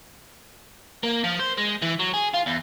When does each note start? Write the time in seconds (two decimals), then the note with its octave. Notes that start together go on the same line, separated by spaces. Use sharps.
1.04 A#3
1.24 F3
1.40 C5
1.58 G#3
1.82 E3
1.99 F#3
2.13 G#4
2.34 F4
2.46 E2